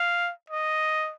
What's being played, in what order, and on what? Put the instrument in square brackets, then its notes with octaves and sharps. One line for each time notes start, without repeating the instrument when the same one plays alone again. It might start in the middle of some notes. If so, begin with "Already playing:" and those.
Already playing: [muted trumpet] F5
D#5